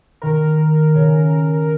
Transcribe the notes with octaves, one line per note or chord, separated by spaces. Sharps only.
D#3 A#4
C#3